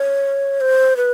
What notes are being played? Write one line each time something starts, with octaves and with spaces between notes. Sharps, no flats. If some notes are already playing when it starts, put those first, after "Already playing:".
Already playing: C#5
C5
B4